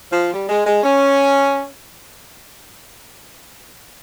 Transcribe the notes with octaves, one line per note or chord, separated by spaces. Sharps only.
F3
G3
G#3
G#3
C#4